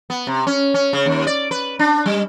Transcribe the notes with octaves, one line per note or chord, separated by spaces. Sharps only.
B3
C3
C#4
C#4
C#3
D#2
D5
B4
D4
G3